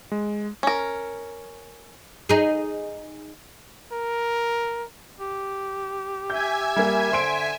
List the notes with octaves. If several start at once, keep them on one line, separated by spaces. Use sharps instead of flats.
G#3
C#4 A#4
D#4 G#4
A#4
G4
E5 G#5 G6 G#6
G3 A#3
D3 C5 C6 D7